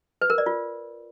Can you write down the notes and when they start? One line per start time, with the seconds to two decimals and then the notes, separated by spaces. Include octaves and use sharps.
0.21 B4
0.30 A#4
0.38 D5
0.46 F4